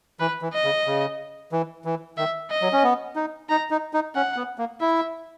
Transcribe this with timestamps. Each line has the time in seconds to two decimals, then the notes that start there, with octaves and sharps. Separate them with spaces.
0.20 E3 B4
0.42 E3
0.53 D#5
0.64 C#3
0.86 C#3
1.52 E3
1.85 E3
2.18 D#3 E5
2.50 D#5
2.62 F#3
2.73 C#4
2.84 B3
3.16 D#4
3.49 D#4 A#5
3.71 D#4
3.93 D#4
4.15 C#4 F#5
4.36 B3
4.58 A#3
4.81 E4 E5